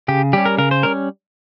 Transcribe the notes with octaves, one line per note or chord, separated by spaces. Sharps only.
C#3 G4
G3 C#4 G4
A#4
C#3 A#4
C5
G3 C#4 A#4